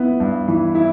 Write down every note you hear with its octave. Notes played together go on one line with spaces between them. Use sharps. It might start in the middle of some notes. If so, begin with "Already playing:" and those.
Already playing: B3 E4
G2
E3
E4